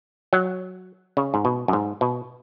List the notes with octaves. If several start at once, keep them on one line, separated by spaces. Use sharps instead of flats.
F#3
C#3
G#2
B2
F#2
G#2
B2